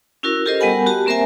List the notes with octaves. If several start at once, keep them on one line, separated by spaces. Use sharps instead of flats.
C#4 E4 F#4 A#4
F4 G4 A4 A#4 C5 D#5
G3 B3 A#4 F#5 G#5 B5
F#4 G4 A5
A#3 C4 A#4 C5 E5 G#5